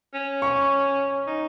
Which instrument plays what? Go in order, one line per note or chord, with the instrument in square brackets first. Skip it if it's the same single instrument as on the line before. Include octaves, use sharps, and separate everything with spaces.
[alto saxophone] C#4
[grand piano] C#6
[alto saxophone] D#4